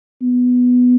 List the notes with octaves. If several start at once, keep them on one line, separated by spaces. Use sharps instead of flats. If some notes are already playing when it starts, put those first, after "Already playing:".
B3